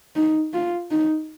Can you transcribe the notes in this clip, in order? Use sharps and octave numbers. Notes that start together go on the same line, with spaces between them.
D#4
F4
D#4